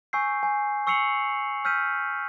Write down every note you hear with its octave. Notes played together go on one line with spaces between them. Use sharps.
G#5 C#6 E6 G6 C7
G#5
C#6 E6 C7 C#7 F7 F#7
E6 F6 G6 B6 D#7